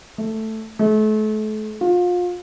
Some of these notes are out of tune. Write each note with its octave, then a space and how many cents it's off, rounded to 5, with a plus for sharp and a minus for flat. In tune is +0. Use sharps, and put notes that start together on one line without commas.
A3 +5
A3 -35
F4 +30